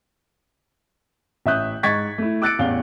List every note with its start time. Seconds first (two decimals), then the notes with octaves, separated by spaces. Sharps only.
1.46 A1 E5 D#6 F#6 G6
1.83 G#2 D#5 C#6 G#6 A6 B6
2.18 A3 E4
2.42 D6 E6 F#6 A6 C#7 D7
2.59 A1 E2 F5 G7